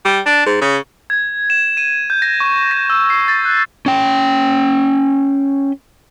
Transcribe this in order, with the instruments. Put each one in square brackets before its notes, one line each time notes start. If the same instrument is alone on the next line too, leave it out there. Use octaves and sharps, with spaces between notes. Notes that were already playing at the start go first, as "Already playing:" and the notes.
[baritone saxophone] G3
D4
G#2
C#3
[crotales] G#6
E7
D#7
G6
A#6
C#6
A#6
E6
C7
A6
F#6
[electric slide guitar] C#4 G5